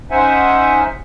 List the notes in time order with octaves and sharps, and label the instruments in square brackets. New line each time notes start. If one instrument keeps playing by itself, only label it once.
[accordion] C#4 D#4 C5 E5 F#5 G#5